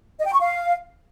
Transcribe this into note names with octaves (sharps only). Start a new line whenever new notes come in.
D#5
G5
C#6
F5